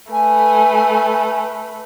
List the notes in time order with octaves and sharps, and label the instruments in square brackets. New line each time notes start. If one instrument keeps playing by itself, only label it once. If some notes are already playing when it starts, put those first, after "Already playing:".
[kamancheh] A3 B4 [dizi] G#5